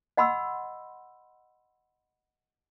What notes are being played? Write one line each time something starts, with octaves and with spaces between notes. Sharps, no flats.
D#5 F#5 B5 C6 E6